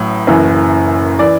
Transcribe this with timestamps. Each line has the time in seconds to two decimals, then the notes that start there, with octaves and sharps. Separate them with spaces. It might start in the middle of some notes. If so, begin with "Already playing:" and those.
Already playing: A1 A2 F#3
0.27 F#1 F#2 E3
1.19 E3 D5